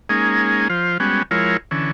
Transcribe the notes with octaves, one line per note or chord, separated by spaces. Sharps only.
G#3 A#3 C#4 D#4 G#4
F3 F4 C5
G3 G#3 B3 C#4 F#4
F3 G#3 E4 F4 A#4 C#5
D3 E3 C#4